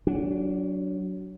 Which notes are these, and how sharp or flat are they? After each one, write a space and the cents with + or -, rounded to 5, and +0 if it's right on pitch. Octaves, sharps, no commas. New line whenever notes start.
F#3 +10 D4 -15